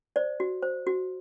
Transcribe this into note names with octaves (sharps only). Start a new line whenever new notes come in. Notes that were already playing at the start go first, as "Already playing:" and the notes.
C5 D5
F#4
C5
F#4